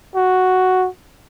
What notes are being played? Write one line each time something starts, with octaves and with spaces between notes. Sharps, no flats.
F#4